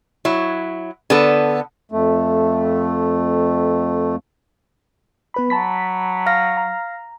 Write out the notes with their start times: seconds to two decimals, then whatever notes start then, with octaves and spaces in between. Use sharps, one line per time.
0.25 F#3 E4
1.10 D3 B3 A4
1.91 F2 A3
5.34 B3 B4 B5
5.50 F#3 A5 B5 B6
6.26 F5 F6 A#6
6.57 A#5